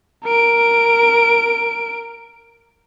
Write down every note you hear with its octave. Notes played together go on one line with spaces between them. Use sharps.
A#4 D7